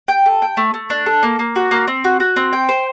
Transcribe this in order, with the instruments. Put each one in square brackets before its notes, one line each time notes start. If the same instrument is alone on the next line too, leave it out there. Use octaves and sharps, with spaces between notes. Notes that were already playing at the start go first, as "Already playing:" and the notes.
[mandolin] G5
A4
G5
A3
A3
D4
A4
A#3
A#3
F#4
A#3
C4
F#4
F#4
C4
G5
C5